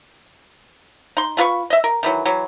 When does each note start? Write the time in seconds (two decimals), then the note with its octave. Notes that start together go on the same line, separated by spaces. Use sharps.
1.17 D#4 C6
1.37 A3 F4 B4 C#6
1.70 D#5 E5
1.84 A#4
2.03 D#3 E3 F#3
2.26 E3 F#3